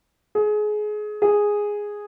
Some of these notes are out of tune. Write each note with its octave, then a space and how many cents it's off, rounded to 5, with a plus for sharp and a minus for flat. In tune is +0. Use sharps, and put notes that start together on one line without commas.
G#4 +25
G#4 -5